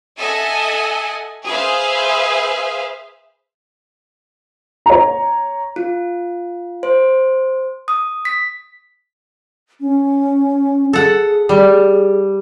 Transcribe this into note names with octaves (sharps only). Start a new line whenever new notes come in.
A4 D#5 E5 F#5 G#5
G#4 B4 C5 E5 F5
C#5 A#5
F4
C5
D#6
B6
C#4
G#4 A4 F#5
G3